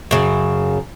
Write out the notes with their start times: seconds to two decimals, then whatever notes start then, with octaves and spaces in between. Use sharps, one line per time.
0.11 F#2 C#3